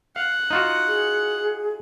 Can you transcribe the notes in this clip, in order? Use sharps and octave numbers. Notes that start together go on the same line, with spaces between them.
F5 F#5
D#4 F4 F#4
G#4